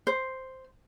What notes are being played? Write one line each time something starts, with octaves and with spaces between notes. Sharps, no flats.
C5